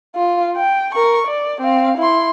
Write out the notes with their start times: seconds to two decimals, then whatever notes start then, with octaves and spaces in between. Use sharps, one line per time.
0.16 F4
0.57 G5
0.95 A#4 C#6
1.27 D5
1.61 C4 F5
1.98 E4 C6